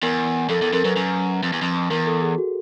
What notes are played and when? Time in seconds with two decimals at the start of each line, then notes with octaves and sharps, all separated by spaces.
0.02 E2 A#4
0.49 F2 A4
0.61 E2 A4
0.73 F2 A#4
0.84 F#2 B4
0.97 F#2
1.43 F2
1.53 E2
1.62 F2
1.90 E2 A#4
2.07 A4
2.22 G#4
2.38 F#4